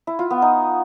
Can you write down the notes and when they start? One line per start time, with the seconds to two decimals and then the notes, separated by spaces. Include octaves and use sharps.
0.07 E4
0.19 F4
0.31 B3
0.42 D#4